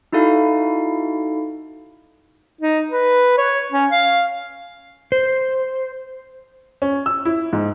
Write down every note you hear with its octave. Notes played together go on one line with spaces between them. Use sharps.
D#4 E4 F#4 A4 F5
D#4
B4
C#5
C#4
F5
C5
C#4
E6
E4
G#2